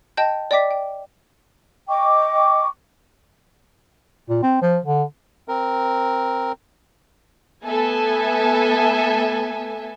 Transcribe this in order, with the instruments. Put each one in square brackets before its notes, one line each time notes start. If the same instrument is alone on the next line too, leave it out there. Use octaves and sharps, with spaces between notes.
[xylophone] D#5 G5 A5 G6
D5 D#5 G5 D6 B6
G5
[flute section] D#5 G5 C#6 D6
[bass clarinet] A#2
C4
F3
D3
[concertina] C4 A#4
[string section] A3 B3 A4 E5 G#5